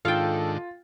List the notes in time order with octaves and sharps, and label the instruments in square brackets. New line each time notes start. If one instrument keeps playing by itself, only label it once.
[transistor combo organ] G#2 D#3 D4 [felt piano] F4 [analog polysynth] A4 [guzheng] F5 G5